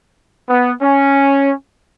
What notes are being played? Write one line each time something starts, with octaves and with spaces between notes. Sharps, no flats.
B3
C#4